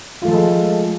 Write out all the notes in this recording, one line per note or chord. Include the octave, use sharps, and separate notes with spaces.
F3 G#3 A3 F4 A4